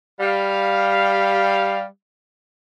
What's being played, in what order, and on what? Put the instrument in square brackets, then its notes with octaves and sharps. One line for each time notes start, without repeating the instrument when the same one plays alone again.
[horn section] G3 F5